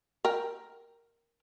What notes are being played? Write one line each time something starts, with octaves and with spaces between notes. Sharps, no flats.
A#4 G5